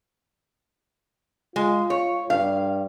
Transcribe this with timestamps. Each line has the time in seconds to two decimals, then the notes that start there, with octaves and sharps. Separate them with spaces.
1.56 G#3 F4
1.90 C#5
2.30 G2 F5